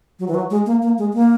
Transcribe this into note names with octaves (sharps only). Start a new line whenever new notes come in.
F#3
E3
F#3
G#3
A#3
A#3
G#3
A#3